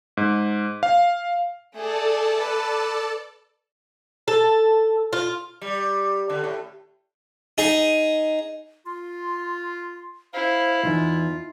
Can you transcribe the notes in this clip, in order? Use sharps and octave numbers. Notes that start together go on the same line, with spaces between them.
G#2
F5
A3 G#4 A4 D5 A5
B4
A4
F4
G3
D3
A2
D#4 G#4
F4 C6
E4 C5 F5
B1 E2 D#4 F4